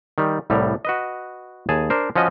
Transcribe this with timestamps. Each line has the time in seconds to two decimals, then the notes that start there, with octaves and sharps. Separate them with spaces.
0.18 D#3 G3
0.50 C2 A2 G3 A#5
0.85 F#4 B4 D#5
1.69 D#2 G#4 G#5 A5
1.90 D4 A#4 C5
2.16 F3 C#4 F#4 D#5